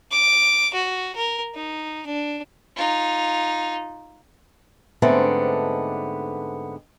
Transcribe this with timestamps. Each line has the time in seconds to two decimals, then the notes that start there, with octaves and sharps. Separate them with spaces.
0.12 D6
0.74 F#4
1.16 A#4
1.55 D#4
2.06 D4
2.76 D#4 F4
5.02 G#2 D3 A3 B3 C4 D4